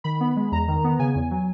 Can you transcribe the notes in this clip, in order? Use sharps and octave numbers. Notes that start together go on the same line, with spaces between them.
D#3 B5
B3
G#3
E2 A#5
D#3
B3
C#3 G#5
E2
F#3